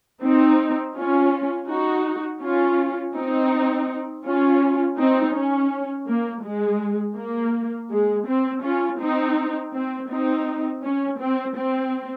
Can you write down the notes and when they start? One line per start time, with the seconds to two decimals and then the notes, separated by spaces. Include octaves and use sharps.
0.23 C4 D#4
0.96 C#4 F4
1.69 D#4 F#4
2.42 C#4 F4
3.15 C4 D#4
4.25 C#4 F4
4.98 C4 D#4
5.34 C#4
6.08 A#3
6.44 G#3
7.17 A#3
7.90 G#3
8.27 C4
8.63 C#4 F4
9.00 C4 D#4
9.73 C4
10.09 C4 D#4
10.83 C#4
11.19 C4
11.55 C4